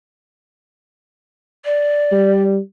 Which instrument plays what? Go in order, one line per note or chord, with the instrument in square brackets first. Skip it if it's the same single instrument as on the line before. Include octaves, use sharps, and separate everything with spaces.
[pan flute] D5
[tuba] G3